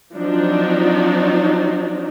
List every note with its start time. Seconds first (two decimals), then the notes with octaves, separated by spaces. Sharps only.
0.16 F3 F#3 C4 D4 D#4